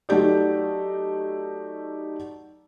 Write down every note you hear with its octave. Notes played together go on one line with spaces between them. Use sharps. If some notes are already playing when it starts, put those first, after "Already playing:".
F#3 A3 D#4 G4 D5